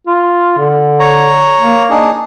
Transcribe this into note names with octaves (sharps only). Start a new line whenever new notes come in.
F4
D3
C#5 A#5
A#3
D4 D#4 G#4